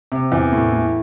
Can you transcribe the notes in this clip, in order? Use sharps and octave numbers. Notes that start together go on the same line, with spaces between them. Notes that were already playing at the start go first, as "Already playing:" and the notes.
C3
E2
A2
A2